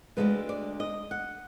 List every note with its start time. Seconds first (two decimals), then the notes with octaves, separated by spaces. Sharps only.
0.17 D2 D3 F3 G#3 B4
0.49 D5
0.80 D#5
1.11 F#5